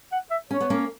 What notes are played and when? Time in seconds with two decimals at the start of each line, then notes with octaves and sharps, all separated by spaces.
0.12 F#5
0.31 E5
0.51 C#4 C#5
0.60 B3
0.70 A#3 C#4